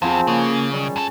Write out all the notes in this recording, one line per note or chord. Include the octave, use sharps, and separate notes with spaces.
E2 F3 C4 G#4
C#3 A#3 C#4 F#4
D#3 F#3 G3
G2 A4